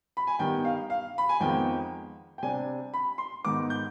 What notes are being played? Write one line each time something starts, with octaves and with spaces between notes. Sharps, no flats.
B5
G#5
G2 D#3 G3 B3 G5
F5
F5
B5
G#5
F2 D#3 G#3 B3 G5
G5
C3 G3 D4 G#5
B5
C6
G#2 D#3 B3 D#4 D6
G6